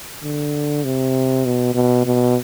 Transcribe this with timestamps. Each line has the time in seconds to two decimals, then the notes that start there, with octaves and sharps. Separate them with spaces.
0.23 D3
0.84 C3
1.45 B2
1.75 B2
2.05 B2